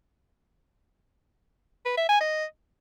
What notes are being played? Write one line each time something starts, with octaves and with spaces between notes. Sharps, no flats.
B4
E5
G#5
D#5